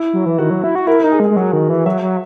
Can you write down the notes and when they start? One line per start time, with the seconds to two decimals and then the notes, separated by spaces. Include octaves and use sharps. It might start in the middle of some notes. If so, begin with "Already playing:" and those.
Already playing: E4
0.13 F#3
0.26 E3
0.38 D#3 F#4
0.50 F#3
0.64 E4
0.75 F#4
0.87 E4 A#4
0.99 A#4
1.04 D#4
1.12 G#4
1.20 G#3
1.25 G#4
1.30 G#3
1.36 F#3 F#4
1.53 D#3
1.69 E3
1.86 F#3 E5
2.02 F#3